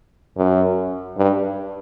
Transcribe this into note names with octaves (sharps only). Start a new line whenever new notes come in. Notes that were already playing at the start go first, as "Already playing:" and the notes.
F#2
G2